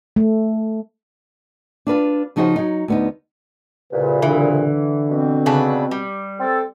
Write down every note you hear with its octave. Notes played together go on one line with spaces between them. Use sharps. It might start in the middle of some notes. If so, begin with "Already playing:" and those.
A3
D4 F4 B4 F5
C#3 F3 D#4 F#4 G#4 C5
F#3 D#4
D2 B3 D#4
C2 A#2 C#3 B4
D3 E3
B2 C4
C#3 D4 B4
G3
C4 A4